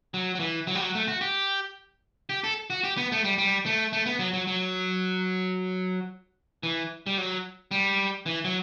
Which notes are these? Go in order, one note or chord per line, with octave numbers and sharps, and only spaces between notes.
F#3
F#3
E3
F#3
G3
F#3
A3
F#4
G4
G4
A4
F#4
G4
B3
A3
G3
G3
A3
A3
B3
F#3
F#3
F#3
E3
G3
F#3
G3
E3
F#3